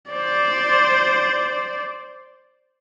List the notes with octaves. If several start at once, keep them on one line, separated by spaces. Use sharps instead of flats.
C5 D5